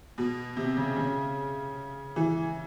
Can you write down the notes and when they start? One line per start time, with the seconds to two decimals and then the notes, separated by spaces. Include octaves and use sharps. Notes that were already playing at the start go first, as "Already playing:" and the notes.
0.18 B2
0.57 C3
0.77 C#3
0.96 C#3
2.16 E3